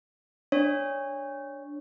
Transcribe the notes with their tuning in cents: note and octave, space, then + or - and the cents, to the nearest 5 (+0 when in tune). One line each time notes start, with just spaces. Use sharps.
D4 +0 C#5 +0